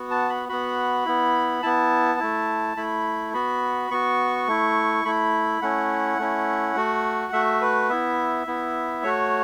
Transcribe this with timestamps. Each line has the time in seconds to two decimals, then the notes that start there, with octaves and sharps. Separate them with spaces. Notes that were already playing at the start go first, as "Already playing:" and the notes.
Already playing: B3 F#4
0.11 A5
0.30 B5
0.49 B3 F#4 B5
1.05 B3 E4
1.63 B3 E4 A5
2.20 A3 E4
2.77 A3 E4 B5
3.34 B3 F#4 B5
3.91 B3 F#4 C#6
4.47 A3 E4
5.05 A3 E4 B5
5.62 A3 C#4 E4 F#5
6.19 A3 C#4 E4
6.76 A3 F#4
7.33 A3 F#4 E5
7.62 B4
7.89 B3 E4 E5
8.47 B3 E4
9.03 A3 F#4 C#5